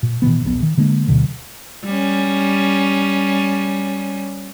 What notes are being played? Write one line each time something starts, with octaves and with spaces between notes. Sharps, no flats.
A#2
A#2 D#3 E3 B3
D#1 A#1 B2 B3
D#3
D3 G#3 A#3 D4
D2 B2 D3 F#3
G3 C#4